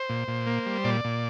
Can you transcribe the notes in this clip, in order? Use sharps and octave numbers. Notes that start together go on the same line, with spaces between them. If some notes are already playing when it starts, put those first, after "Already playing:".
Already playing: C5
A#2
A#2
A#3
G3
A#2 D5
A#2